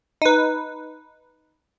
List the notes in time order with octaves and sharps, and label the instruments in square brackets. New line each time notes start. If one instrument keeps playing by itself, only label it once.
[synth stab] D#4 B4